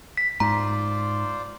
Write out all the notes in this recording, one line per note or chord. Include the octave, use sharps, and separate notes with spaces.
B6
G#2 F4 C5 D5 A#5